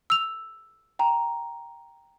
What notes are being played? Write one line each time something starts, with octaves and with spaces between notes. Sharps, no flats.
E6 F7
G5 A#5